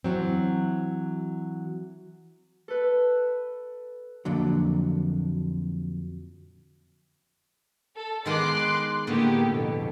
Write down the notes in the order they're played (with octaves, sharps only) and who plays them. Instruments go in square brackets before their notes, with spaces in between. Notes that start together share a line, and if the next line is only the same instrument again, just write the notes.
[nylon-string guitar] E3 F#3 C4
[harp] A4 B4
[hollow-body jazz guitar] F2 A#2 D3 F#3
[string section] A4
[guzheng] D#3 G#3 B3 [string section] C6 D6 F#6
[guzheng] A2 D3 [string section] A#3 B3 G4
[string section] F2 B2